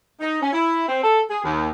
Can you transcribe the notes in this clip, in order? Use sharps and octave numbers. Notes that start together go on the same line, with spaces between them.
D#4
C#4
E4
C4
A4
G#4
D#2